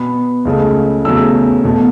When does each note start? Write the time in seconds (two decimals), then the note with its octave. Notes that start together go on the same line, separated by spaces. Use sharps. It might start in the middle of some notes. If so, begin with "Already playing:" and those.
Already playing: B2 B3 B5
0.45 C#2 C#3 A3
1.05 E2 C#3 F#3 A3 E6
1.64 E2 B2 A3